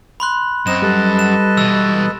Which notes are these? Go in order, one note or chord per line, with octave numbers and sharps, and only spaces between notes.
B5 C6 F#6
F#2 C4 D#5 A#5 E7
G3 A4 B4 D#5
E7
B2 E3 E6